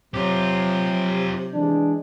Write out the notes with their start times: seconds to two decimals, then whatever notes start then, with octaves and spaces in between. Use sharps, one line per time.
0.14 C3 F#3 F4 G4
1.53 E3 G#3 D4